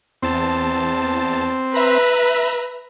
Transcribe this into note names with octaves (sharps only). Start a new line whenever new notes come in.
E2 C4 A5
B4 E5 A#5 B5